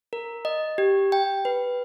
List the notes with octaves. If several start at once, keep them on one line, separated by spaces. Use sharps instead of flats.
A#4
D#5
G4
G5
B4